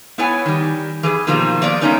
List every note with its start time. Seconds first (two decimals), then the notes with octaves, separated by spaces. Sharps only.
0.18 B3 E4 B4 C#5 F#5 G#5
0.46 D#3 G3
1.03 E3 G#4 B4
1.27 B2 D#3 F3 G3 A#3
1.62 F3 A#3 B3 D5
1.81 G#3 A3 B3 C#4 D#4 A#4